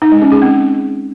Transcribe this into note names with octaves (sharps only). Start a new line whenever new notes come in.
D#4
G#3
C#4
G#4
C4